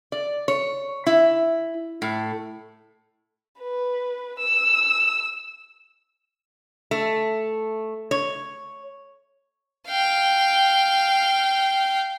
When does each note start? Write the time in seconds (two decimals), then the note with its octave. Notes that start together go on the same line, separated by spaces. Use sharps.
0.12 D5
0.48 C#5
1.07 E4
2.02 A2
3.61 B4
4.40 E6
6.91 A3
8.11 C#5
9.87 F5 G5